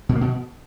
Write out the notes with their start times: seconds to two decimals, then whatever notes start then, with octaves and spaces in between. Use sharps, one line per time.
0.09 B2
0.15 A#3
0.21 B2